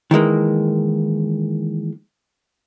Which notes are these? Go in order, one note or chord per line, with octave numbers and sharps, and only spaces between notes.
D#3 E3 G#3 A#3